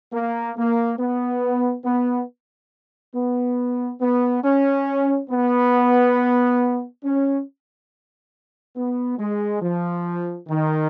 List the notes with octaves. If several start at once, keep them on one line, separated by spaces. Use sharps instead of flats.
A#3
A#3
B3
B3
B3
B3
C#4
B3
C#4
B3
G#3
F3
D#3